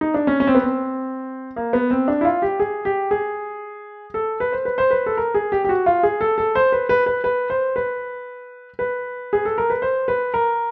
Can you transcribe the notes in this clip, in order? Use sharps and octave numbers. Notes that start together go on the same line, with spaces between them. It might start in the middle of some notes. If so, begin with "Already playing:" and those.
D#4
D4
C#4
C#4
C4
B3
C4
A#3
B3
C4
D4
E4
F4
G4
G#4
G4
G#4
A4
B4
C5
B4
C5
B4
A4
A#4
G#4
G4
G4
F#4
F4
G#4
A4
A4
C5
B4
B4
B4
B4
C5
B4
B4
G#4
A4
A#4
B4
C5
B4
A#4